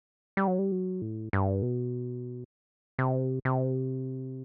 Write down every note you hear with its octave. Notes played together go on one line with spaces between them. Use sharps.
G3
F#3
G3
F#3
A2
G2
B2
C3
C3